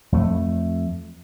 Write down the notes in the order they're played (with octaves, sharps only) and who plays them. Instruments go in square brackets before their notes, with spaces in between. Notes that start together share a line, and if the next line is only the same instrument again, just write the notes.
[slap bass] F2 A3